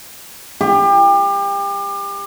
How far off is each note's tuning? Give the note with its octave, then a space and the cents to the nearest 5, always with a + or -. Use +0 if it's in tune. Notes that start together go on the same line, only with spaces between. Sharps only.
G4 +30